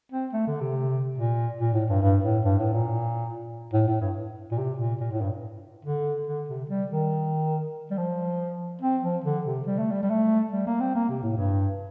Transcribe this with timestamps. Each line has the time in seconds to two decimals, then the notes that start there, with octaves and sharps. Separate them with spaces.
0.12 C4
0.33 A3
0.47 D3
0.61 C3
1.18 A#2
1.60 A#2
1.74 A2
1.89 G2
2.02 G2
2.24 A2
2.45 G2
2.60 A2
2.73 A#2
3.73 A2
3.88 A2
4.01 G2
4.52 A#2
4.58 C3
4.79 A#2
5.00 A#2
5.11 A2
5.21 G2
5.85 D3
6.27 D3
6.49 C3
6.70 G3
6.91 D#3
7.91 G3
7.98 F3
8.82 C4
9.03 F3
9.24 D3
9.46 C3
9.66 G3
9.79 A3
9.92 G3
10.03 G3
10.10 A3
10.52 G3
10.67 A#3
10.80 C4
10.95 A#3
11.09 C3
11.23 A2
11.37 G2